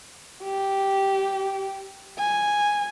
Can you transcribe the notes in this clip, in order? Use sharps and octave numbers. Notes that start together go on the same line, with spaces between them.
G4
G#5